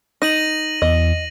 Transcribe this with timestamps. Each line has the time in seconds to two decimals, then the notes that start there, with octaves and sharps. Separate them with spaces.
0.22 D#4 A#6 D#7 F#7
0.82 E2 D#5